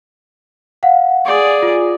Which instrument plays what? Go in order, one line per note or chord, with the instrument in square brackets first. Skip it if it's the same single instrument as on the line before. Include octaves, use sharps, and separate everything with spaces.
[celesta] F5 F#5
[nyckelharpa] G#4 D5
[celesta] F4